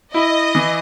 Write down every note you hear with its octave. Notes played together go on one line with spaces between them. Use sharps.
E4 D#5
E3